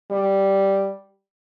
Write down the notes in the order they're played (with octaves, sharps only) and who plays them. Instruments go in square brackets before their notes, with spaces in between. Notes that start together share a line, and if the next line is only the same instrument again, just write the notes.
[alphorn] G3